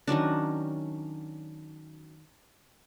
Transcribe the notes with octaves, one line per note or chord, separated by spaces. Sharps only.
D#3 F#3 C#4 D4